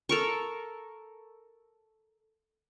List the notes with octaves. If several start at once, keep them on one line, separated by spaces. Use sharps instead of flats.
A4 A#4 C#6